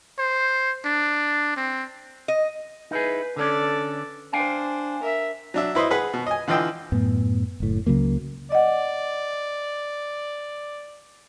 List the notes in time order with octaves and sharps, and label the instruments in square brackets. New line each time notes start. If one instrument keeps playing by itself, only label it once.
[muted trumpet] C5
D4
C4
[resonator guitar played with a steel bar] D#5
[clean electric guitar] D#4 E4 G#4 [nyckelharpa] B4
[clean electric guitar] D3 C#4 [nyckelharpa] A4 D5
[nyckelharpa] D4 C5 [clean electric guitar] F5 G5 G#5
[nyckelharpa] A#4 E5
[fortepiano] F#3 D4 E5
E4 B4 C5 D#5
G#4 B4 F#5
B2
D#5 G#5
D3 E3 F4 D#5 G5 E6
[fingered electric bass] F#2 A2 B3
F#1 A2
C#2 C#3 F#3 A#3
[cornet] D5 [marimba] D#5 F#5